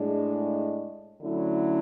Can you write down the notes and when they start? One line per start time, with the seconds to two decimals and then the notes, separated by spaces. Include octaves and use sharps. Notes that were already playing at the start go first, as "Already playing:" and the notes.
Already playing: A2 G#3 D4
1.21 D3 F#3 A3 C#4 E4